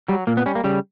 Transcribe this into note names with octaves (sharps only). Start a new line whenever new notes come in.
F#3 G3
A#2 A#3
B3
G3 C#4
A#3
C#3 G3